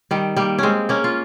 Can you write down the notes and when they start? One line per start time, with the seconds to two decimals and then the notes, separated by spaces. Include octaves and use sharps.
0.11 D#3 G3
0.37 G3 A#3
0.59 G#3 C4 C#4
0.89 A#3 C#4
1.04 F4